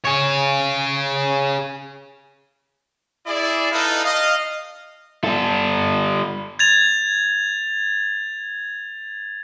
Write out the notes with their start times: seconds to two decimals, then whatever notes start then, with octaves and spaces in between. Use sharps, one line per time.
0.05 G#4 C#5
3.27 E4 G#4 D5
3.72 D#4 E4 A4 B4 D#5 F5
4.03 D#5 F5
5.24 G3 A4
6.59 G#6 A6 F7